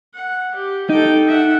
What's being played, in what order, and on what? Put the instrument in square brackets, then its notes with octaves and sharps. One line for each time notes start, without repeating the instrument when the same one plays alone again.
[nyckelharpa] F#5
G4
[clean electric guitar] D#4 [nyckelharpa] A4 G5
[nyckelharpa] E5 F#5